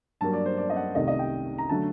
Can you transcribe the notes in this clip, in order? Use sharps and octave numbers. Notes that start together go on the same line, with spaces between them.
G2 F#3 A#3 A5
D5
C5
D5
D#5
F#5
C2 C3 D#3 A3 D#5
D#5
G5
A#5
D3 F#3 A3 A5